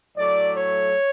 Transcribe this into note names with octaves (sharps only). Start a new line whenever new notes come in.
A2 F#3 A3 D5
C#5